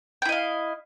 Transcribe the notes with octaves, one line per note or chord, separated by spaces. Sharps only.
E4 D#5 F5 G5